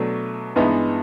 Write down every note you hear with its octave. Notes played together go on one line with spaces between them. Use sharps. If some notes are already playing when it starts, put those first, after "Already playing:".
Already playing: B2 F#3 A3 D4
G2 E3 G#3 B3 D#4